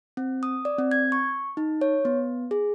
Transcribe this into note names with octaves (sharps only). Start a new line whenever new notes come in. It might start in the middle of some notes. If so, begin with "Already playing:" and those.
C4
D#6
D5
C4
G#6
C#6
D#4
C#5
B3
G#4